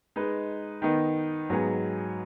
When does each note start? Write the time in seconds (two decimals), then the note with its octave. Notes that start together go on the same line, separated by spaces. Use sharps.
0.16 G#3 D#4 B4
0.82 D#3 B3 D#4
1.50 G#2 F#3 B3 G#4